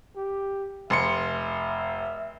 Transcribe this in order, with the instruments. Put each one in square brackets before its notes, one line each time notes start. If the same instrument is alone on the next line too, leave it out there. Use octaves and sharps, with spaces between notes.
[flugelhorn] G4
[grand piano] F1 C6 C#7 [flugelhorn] E5